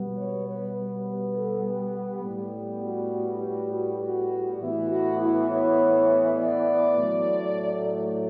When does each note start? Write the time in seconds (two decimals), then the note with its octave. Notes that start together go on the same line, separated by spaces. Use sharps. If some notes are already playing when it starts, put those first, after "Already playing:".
Already playing: B2 G3 B3
0.17 C#5
0.47 B4
1.06 B4
1.36 A4
1.65 G4
2.24 A2 G3 B3
2.83 F#4
3.43 F#4
3.72 F#4
4.02 F#4
4.61 A2 E3 B3 E4
4.90 F#4
5.20 E4
5.50 C#5
6.38 D5
6.97 A2 F#3 A3